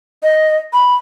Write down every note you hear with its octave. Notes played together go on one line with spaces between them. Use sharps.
D#5
B5